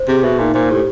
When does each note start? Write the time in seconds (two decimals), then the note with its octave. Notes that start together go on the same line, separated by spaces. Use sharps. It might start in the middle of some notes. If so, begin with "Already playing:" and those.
Already playing: C5
0.08 C3 G#4
0.24 B2 E5
0.39 A#2 D#4
0.54 A#2 C5
0.70 A2 G4